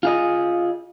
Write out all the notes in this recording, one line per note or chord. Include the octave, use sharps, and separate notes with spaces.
F4 G#4 D#5